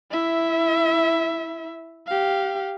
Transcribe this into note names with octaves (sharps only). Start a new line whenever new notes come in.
E4 E5
G4 F5